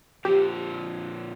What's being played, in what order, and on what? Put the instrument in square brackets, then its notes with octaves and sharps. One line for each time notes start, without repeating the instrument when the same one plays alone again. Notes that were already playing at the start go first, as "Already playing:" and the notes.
[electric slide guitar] A#2 F3 C4 [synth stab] G4